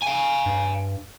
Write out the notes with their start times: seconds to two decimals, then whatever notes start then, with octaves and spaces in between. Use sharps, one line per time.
0.02 F5 G#5
0.46 G2